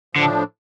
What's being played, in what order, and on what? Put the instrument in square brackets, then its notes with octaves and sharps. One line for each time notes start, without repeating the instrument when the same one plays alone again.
[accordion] A2 F3 D4 [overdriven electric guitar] D3